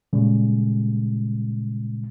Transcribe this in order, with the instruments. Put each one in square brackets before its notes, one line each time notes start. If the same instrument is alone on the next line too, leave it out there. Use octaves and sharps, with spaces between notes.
[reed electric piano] A#2 C#3 G3 G#3